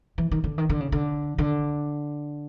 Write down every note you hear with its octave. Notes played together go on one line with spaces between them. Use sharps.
E3
D#3
D3
D#3
D3
C#3
D3
D3